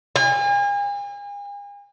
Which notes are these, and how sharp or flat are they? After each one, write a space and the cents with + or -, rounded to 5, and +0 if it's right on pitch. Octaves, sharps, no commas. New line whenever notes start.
G#5 -40